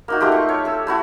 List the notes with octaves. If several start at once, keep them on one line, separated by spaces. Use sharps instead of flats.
A#3 D#4 F#4
A3 D#4 F4 G4
C#6
C#5
A4 E6
A3 E4 F#4